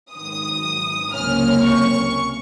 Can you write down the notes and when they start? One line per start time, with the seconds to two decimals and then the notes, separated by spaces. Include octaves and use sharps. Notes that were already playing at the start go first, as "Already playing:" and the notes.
0.12 G#2 D#3 F#3 D#6
1.13 C#2 C3 F#3 A#3 C#4 F6
1.64 C#6